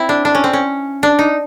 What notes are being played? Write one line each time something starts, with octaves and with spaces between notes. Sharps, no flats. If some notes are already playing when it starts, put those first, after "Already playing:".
Already playing: C4 E4
D4
D4
C#4
C4
C#4
D4
D#4